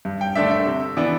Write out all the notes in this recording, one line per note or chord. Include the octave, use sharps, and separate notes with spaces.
G2
G5
D3 A3 D4 E5
E5
C3
E3 B3 D4